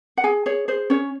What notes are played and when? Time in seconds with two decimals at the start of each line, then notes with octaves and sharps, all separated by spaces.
0.17 F#5
0.24 G#4 G#5
0.46 G#4 C#5
0.68 G#4 C5
0.90 C#4 C#5